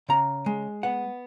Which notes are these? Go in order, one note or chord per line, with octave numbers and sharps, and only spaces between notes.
C#3 A#5
G#3
B3 F#5